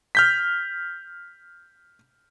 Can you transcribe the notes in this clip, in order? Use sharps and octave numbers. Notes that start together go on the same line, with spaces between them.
F6 G6 B6